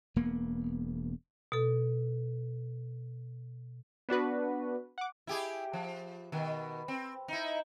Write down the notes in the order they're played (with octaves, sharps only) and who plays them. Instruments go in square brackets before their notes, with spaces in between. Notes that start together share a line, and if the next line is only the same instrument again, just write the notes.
[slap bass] E1 A#3 B3
[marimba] B2 A4
[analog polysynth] B3 D4 F#4 B4
F#5 D6
[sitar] E4 G4 G#4
F3
B2 D#3
C4
D#4 E4